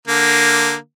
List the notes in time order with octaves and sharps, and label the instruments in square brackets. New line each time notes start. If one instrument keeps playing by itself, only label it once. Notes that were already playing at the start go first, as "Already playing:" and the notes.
[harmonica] D3 A#3